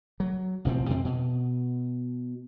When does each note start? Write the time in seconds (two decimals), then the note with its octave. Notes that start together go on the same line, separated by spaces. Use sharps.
0.20 F#3
0.65 A1 B2 F3 C4
0.90 F2 C3 C4
1.05 B2